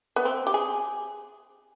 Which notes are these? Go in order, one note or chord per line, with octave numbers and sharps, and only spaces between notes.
B3
C4
G4
G#4